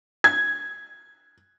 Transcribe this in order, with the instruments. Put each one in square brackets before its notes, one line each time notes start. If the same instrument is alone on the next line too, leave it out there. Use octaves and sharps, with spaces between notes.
[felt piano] G#6